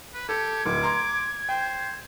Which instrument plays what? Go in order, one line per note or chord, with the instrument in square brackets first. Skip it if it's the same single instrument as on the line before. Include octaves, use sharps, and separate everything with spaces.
[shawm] B4
[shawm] G4 [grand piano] A4 [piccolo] G#6
[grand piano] D1 [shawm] D6
[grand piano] A#5 C6
[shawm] C5 [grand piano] G5